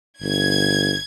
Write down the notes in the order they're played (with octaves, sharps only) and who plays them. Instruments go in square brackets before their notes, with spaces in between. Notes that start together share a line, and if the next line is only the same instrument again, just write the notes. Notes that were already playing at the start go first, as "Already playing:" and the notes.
[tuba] G1 [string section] G#6